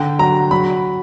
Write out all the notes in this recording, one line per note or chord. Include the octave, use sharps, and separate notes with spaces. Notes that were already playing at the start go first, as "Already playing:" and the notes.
Already playing: D3 G5
F#3 A#5
F#3 B5